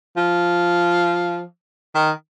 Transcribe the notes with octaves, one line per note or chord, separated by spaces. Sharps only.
F3
D#3